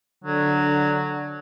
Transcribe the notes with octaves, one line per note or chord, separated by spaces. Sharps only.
D3 F#3